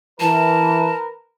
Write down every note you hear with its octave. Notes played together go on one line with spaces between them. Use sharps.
E3 A#4 B4 A5